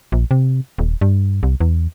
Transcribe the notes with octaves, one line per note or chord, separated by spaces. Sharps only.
A#1
C3
D#1
G2
C2
E2